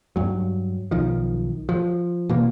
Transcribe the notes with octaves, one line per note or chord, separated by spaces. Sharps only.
G2 F#3
B1 D#3 F3
F3
B2 E3 A#3